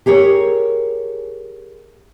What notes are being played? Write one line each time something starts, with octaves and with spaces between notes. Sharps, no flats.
G4 G#4 A#4 C#5